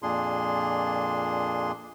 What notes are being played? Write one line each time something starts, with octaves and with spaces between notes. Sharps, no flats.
F2 A#2 A#3 D4 G#4 C6